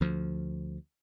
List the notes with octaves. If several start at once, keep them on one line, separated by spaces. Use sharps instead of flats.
D2 F3